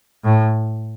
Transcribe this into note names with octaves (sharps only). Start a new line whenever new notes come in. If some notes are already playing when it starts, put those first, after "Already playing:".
A2